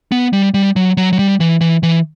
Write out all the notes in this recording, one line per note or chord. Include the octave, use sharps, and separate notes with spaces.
B3
G3
G3
F#3
F#3
F#3
G3
E3
E3
E3